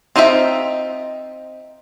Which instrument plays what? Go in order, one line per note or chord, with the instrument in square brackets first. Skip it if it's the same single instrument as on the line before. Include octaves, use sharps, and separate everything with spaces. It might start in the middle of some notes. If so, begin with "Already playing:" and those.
[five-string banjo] C4 D#4 F4 D#5 E5